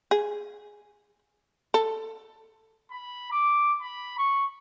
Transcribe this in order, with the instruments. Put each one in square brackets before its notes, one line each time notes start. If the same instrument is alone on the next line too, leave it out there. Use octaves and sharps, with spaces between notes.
[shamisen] G#4
A4
[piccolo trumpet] B5
D6
B5
C#6